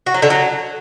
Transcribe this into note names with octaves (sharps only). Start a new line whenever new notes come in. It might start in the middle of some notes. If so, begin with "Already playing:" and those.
F#4
F#3
D3
F#3